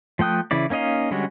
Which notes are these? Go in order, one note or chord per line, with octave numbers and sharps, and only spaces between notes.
F3 A3 G5 D#6 F#6
C#3 E3 E4 D5
A#3 C#4 D#4 D#5 F5
D3 G3 G#3 C#4 F#4